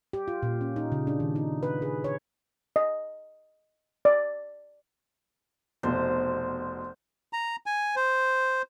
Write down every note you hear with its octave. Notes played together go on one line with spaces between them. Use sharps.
G4
F4
A#2
C#4
D#4
C#3
D4
D#3
D#4
B4
G#4
C#5
D#5
D5
F1 B2 C5
A#5
G#5
C5